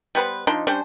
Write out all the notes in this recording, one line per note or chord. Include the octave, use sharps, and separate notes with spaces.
G3 B3 B4 C5
F3 D4 D#4 C6
G3 C#4 D4 C5